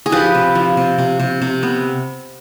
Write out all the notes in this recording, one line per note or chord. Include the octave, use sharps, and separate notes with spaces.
G#4
F3 G4 B4
C3
F3
C3
C3
C3
C3
B3